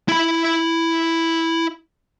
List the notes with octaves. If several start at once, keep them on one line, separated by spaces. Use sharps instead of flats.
E4 B5